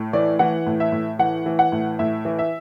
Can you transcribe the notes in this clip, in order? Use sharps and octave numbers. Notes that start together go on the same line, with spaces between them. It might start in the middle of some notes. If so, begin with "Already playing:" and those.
Already playing: A2
E3 D5
E3 F#5
A2
E5
A2
E3 F#5
E3
F#5
A2
A2 E5
E3
E5